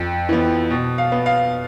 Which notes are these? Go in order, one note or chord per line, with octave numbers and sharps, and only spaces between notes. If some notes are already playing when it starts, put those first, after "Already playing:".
Already playing: F2
E3 B3
B2
F5
B3
F5